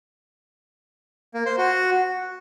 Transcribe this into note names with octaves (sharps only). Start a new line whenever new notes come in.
A#3
C5
F#4